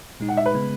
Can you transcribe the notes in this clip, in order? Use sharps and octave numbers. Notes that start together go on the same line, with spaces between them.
A#2 G#3 D#4
F#5
E5
B4
C#3 G#3 B3